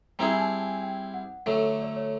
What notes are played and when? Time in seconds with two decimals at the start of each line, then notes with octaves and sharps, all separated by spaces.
0.19 G3 C4 E4 G#4 A#5
0.33 G#5
0.40 A5
0.62 G#5
0.83 G5
1.14 F#5
1.46 D3 F#3 A3 C#5
1.82 D5
1.96 C#5